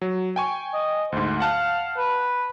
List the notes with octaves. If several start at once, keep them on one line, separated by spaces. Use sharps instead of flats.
F#3
G5 G#5 C#6
D#5
D2 G#2 C5
F5 F#5 A5 F#6
B4